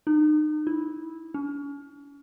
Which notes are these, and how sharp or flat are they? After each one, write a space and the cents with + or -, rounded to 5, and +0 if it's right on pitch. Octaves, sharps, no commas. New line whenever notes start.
D#4 -35
E4 -15
C#4 +35